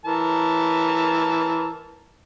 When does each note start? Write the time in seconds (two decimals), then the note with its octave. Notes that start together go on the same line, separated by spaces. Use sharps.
0.05 E3 A#4 A5